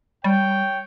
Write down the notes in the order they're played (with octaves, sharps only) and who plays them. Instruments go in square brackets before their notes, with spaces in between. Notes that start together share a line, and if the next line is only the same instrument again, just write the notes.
[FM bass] G3 [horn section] C#5 G5